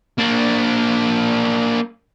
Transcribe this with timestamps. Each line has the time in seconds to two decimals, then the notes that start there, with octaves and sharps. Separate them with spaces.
0.18 A#3 D4